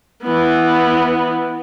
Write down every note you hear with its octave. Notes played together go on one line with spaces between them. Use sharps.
E3 B3